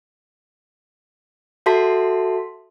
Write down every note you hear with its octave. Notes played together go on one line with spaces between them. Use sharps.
F#4 A4 E5 A5 C6 B6